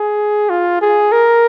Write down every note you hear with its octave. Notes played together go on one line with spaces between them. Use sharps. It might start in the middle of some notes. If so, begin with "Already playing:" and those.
Already playing: G#4
F4
G#4
A#4